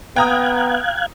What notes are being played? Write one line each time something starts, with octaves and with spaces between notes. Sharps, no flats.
B3 F5 G5 A#5 D#6 F#6 G#6